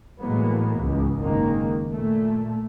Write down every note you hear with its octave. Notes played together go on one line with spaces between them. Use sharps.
A2 E3 F#3 G#3 A#3 B3
C#2 G#2
F#1 D#3 G#3 A#3
A#2 A3